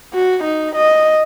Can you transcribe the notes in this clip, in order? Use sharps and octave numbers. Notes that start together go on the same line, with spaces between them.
F#4
D#4
D#5